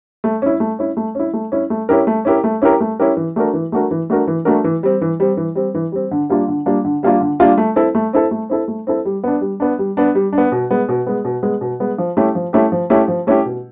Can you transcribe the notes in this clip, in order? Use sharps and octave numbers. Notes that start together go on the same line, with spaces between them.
A3
C#4 E4
A3
C#4 E4
A3
C#4 E4
A3
C#4 E4
A3
C#4 E4 G4 A#4
A3
C#4 E4 G4 A#4
A3
C#4 E4 G4 A#4
A3
C#4 E4 G4 A#4
E3
A3 D4 F#4 A#4
E3
A3 D4 F#4 A#4
E3
A3 D4 F#4 A#4
E3
A3 D4 F#4 A#4
E3
G3 C4
E3
G3 C4
E3
G3 C4
E3
G3 C4
D3
G3 A#3 D4 F4
D3
G3 A#3 D4 F4
D3
G3 A#3 D4 F4
D3
G3 A#3 D4 F4
A3
C4 E4 A4
A3
C4 E4 A4
A3
C4 E4 A4
A3
C4 E4 A4
G3
B3 D4
G3
B3 D4
G3
B3 D4
G3
D4
B3
B2
G#3 B3
B2
G#3 B3
B2
G#3 B3
B2
G#3 B3
F3
A3 C#4 E4 G4
F3
A3 C#4 E4 G4
F3
A3 C#4 E4 G4
F3
A3 C#4 E4 G4
B2